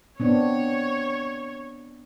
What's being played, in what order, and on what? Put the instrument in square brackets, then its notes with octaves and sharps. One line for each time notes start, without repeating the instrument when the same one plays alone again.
[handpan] B3 C4 D4 [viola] C#5